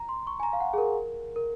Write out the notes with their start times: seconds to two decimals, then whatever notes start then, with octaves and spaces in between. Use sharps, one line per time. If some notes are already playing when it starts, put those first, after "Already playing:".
Already playing: A#5
0.09 C6
0.27 C#6
0.40 G#5
0.43 A#5
0.53 F5
0.60 F#5
0.73 G#4
0.78 A#4
1.36 A#4